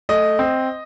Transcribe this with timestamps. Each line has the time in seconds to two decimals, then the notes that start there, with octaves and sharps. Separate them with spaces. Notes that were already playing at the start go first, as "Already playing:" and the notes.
0.09 A3 D#5
0.39 C4